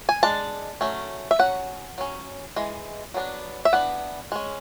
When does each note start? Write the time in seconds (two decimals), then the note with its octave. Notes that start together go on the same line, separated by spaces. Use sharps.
0.09 G#5
0.23 G#3 D4 A5
0.81 F#3 A3 C#4
1.31 E5
1.39 F#3 C#4 F#5
1.98 F#3 C#4
2.56 E3 G#3
3.14 F#3 B3 D4
3.65 E5
3.73 E3 B3 D4 F#5
4.32 G#3 C#4